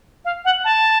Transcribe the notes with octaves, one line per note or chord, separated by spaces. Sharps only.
F5
F#5
A5